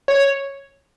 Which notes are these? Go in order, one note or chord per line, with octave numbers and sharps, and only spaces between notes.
C#5